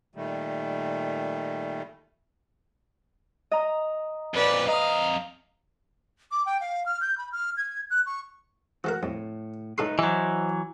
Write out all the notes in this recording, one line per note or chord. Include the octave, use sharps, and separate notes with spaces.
A#2 D#3 G3 A3
D#5 A#5
F2 A#2 B4 D5
F2 D#5 F5 A#5 D#6
D6
G5
F5
F6
G6
B5
F6
G#6
F#6
C#6
E3 A3 F#4 A#4
F2 A2
A2 A3 D#4 A4 B4 C6
E3 F#3 C5 D#5